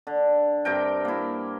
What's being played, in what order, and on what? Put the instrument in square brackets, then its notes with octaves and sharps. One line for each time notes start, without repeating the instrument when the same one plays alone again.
[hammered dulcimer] D3
G2 C3 A#4 G5
A#3 E4